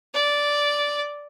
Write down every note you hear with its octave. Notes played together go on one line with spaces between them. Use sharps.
D5